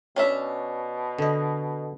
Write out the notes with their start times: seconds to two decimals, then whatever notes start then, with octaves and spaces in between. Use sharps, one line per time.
0.16 B2 C#4 D4 E5
1.18 D3 D#5